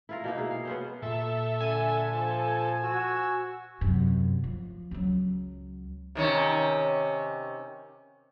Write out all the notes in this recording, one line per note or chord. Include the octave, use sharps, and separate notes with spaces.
E4 F4 A#4
B2 A#3 D#4
E4 G#4
F5
B3 C#4 C5
A#2 A4 E5
D3 G#5
F3 A4
F#4 E6
F#2 C3
F3
C#2 F#3
C3 D#3 C#4